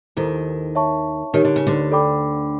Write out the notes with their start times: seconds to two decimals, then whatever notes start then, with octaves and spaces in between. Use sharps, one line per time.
0.17 D#2 D#3 E4 A4 C5
0.75 C#5 E5 A5 C#6
1.33 D#3 D#4 G4 A#4 C#5
1.45 D3
1.56 C#3
1.67 D2 D3
1.91 A4 D5 G5 B5 D6